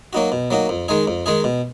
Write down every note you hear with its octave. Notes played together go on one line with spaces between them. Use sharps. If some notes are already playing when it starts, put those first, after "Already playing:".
F#3 A#3 D#4 F#4
B2
F#3 A#3 D#4 F#4
F2
D#3 G#3 D#4 G#4
F2
D#3 G#3 D#4 G#4
B2